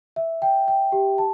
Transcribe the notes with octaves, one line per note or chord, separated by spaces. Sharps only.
E5
G5
G5
G4
A5